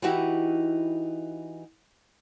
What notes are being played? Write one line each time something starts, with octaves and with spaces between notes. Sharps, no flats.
E3 D#4 E4 F#4 G4